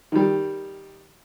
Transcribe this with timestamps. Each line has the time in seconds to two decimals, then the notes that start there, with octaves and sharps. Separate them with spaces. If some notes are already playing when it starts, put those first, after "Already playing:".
0.12 D#3 G3